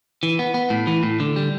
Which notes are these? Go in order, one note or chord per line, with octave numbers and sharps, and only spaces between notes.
E3
B3
B3
A2
E3
A2
D3
G3